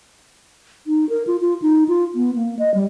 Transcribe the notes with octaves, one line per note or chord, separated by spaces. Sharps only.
D#4
A#4
F4
F4
D#4
F4
B3
A#3
D#5
G3